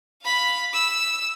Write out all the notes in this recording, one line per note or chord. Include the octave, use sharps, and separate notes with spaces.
F5 B5
E6